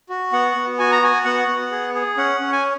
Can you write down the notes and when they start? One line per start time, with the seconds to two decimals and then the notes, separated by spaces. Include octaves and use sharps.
0.09 F#4
0.33 B3 F#5
0.56 B3
0.79 F#4 G#5
0.92 A#5
1.02 F#4 G#5
1.25 B3 F#5
1.48 B3
1.72 G#4
1.95 G#4
2.17 C#4 F#5
2.41 C#4
2.52 G#5